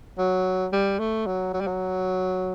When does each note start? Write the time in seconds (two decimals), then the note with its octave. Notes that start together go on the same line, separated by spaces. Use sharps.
0.18 F#3
0.72 G3
0.99 A3
1.27 F#3
1.54 F#3
1.61 G3
1.67 F#3